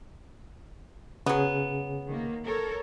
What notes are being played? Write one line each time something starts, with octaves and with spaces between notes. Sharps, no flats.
C#3 F#3 B3 G#4
D#3 A#3
A4 A#4 C#5